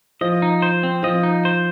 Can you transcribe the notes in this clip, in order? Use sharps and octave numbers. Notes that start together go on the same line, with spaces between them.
F3 D#5
D#4
C5
C4
F3 D#5
D#4
C5